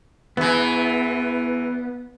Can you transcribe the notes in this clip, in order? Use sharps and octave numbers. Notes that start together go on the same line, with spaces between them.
E2 E3 B3